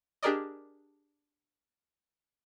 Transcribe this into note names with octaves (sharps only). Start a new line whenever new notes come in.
D4 G4 G#4 A#4 D5 D#5